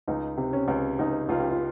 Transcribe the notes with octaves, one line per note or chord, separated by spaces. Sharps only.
C#2 D#4
C3
C#4
C#2
C#2 D#4
C#2 F4
G4
F4